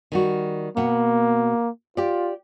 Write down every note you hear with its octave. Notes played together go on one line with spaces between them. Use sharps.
D#3 G3 F#4
B2 A#3 F#5
F4 G4 D5